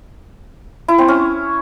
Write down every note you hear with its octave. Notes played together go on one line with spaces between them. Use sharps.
E4
C4
C#4